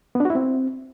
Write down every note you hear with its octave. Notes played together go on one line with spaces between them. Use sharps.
B3
D4
F#4
E4
C4